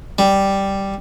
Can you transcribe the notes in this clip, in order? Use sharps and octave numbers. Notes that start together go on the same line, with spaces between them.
G3